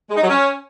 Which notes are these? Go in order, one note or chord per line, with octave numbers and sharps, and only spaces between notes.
G#3
D#4
F#3
C#4